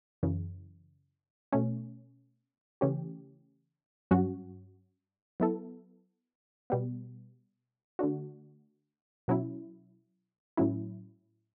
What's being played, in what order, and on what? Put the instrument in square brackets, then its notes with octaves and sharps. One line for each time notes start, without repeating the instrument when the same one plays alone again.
[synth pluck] F#2 C#3 E3
B2 A3 C#4
C#3 E3 A3 C#4 G4
G2 F#3 C#4 F#4
F#3 B3 E4 A4
B2 G3 B3
D3 A3 D4 F#4
B2 F#3 C#4 E4
A2 F#3 C#4 E4